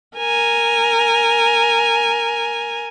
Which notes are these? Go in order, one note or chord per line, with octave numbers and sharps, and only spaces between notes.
A#4 G#5